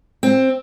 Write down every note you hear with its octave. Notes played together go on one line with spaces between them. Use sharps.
C4